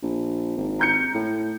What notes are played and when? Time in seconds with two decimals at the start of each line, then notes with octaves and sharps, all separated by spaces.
0.03 A#1
0.57 G#1
0.79 A#5 G6 C#7
1.14 A2